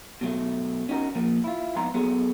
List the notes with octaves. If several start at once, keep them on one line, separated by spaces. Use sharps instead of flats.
B2 F#3 A3
C#4 D#4 F#4 A#4
A#2 F3 A#3
E4 F4
F2 G#2 B3 D#4 A#5 C6
F#3 B3 F#4 G#4 A4 C#5